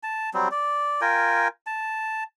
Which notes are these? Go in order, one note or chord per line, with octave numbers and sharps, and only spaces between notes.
A5
F#3 G3 C4
D5
F4 A#4 G5 G#5
A5